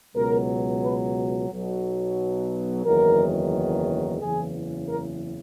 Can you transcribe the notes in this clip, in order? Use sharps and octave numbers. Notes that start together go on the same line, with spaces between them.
C#2 B2 F#3 A#4
B4
B1 B2 F#3
F#1 E2 D#3 F#3 A#4
F#1 E2 C#3 E3 G#4
A#4